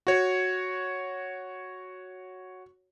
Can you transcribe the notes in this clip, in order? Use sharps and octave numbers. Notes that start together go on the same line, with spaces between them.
F#4 C#5